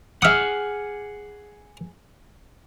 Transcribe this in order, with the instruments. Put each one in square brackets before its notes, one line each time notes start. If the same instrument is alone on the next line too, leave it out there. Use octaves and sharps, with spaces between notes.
[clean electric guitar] G#4 F#5 [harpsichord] E5 D#6 [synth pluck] D6 F6